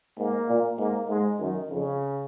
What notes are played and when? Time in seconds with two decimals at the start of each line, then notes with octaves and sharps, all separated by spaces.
0.18 G#2 A#3
0.48 A#2
0.78 G#2 A#3
1.08 G#2 G#3
1.39 F#2 D#3
1.69 F2 C#3